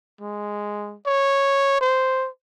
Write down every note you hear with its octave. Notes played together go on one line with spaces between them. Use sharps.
G#3
C#5
C5